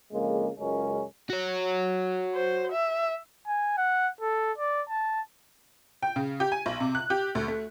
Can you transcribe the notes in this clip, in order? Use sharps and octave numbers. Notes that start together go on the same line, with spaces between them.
F2 C#3 G#3 A#3
C#2 F#2 C#3 G#3 C#4 A#4
F#4 C#5
C5
E5
G#5
F#5
A4
D5
A5
G5
C#3
G4
G#5
B1
C3
F#6
G4
D2
A3